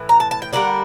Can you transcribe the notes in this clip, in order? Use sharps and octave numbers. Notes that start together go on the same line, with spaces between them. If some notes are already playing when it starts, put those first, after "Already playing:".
Already playing: A2 E3
A#5
A5
A5
G5
D3 G3 A#3 D4 F#5